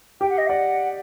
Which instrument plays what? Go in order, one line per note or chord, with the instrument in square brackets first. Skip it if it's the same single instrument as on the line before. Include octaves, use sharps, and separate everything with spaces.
[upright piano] G4 [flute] G5
[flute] F#5
D#5
[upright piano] D5 [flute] F#5